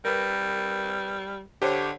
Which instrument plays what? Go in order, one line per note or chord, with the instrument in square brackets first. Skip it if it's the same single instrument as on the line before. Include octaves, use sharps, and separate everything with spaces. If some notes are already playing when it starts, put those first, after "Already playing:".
[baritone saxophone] G3 [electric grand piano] A#4 B4
[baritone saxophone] D3 [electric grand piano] G4 C5 C#5